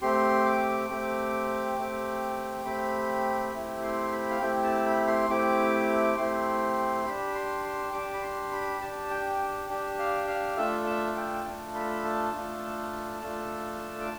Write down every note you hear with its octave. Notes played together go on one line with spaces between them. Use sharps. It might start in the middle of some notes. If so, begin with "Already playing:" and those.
A3 C4 G4 C6
D6
A3 C4 G4
A3 C4 G4
A3 C4 G4 B5
A3 C4 E4 G4
C6
B5
F5
A3 C4 E4 G4 G5
A5
B5
C6
A3 C4 E4 G4 D6
A3 C4 E4 G4 C6
D4 G4 B5
C6
C6
D4 G4 D6
B5
C6
B5
D4 G4 A5
G5
D4 G4
F5
F5
A3 D4 F4 A4 E5
E5
G5
A3 D4 F4 A4 A5
B5
A5
A3 D4 F4 A4
A3 D4 F4 A4
D6